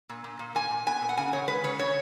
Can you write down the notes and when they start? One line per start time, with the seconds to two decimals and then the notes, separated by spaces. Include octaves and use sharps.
0.09 A#2
0.24 A#2
0.39 A#2
0.55 A#2 G#5
0.71 A#2
0.87 B3 G#5
1.02 A#2
1.09 F#5
1.17 C#3 G#5
1.33 C#3 C#5
1.48 G#3 B4
1.64 C#3 C#5
1.79 C#3 C#5